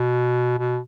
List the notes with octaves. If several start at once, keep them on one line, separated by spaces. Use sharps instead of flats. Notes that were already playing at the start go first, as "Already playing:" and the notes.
Already playing: B2
B2